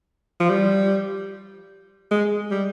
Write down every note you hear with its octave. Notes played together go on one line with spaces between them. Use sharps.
F3
G3
G#3
G3